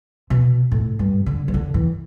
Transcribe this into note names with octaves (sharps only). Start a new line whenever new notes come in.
B2
A2
G2
D3
E3
D3
E3